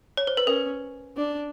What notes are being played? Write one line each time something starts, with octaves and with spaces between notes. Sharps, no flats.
C#5
C5
B4
C#4 A#4
D4